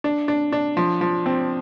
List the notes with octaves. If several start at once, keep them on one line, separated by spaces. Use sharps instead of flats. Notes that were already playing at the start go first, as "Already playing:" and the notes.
D4
D4
D4
F3
F3
C4